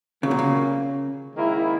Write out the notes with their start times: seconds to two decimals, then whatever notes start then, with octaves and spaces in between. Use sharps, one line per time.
0.23 A#2 C#3 F#3 A#3
0.31 B2
0.39 C#3
1.35 G#2 D#3 A#3 E4